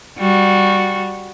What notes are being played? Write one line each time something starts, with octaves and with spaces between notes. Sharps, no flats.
G3 F#4